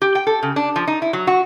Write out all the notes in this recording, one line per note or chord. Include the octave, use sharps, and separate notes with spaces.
G4
G5
A4
C#3
D4
F3
D#4
E4
F#3
F#4